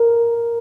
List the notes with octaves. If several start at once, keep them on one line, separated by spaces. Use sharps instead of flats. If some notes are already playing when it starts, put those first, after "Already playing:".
Already playing: A#4